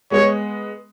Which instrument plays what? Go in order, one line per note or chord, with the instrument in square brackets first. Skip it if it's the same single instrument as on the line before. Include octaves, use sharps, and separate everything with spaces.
[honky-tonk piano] G#3 B3 [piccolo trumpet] C#5